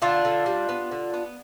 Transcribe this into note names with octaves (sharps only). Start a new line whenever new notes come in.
D3 D4 F4
D3
G3
B3
D3
B3